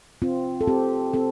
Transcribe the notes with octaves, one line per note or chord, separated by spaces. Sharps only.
C4 F4
A4
C4 G4
C4 A4